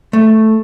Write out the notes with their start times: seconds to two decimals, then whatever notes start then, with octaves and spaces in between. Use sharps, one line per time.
0.13 A3